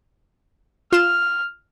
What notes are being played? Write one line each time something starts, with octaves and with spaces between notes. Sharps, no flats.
F4 F6 E7